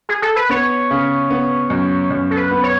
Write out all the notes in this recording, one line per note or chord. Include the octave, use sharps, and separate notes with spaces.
G#4
A4
B4
B3 C#5
C#3
B3
F#2
F#2
A4
B4
B3
C#5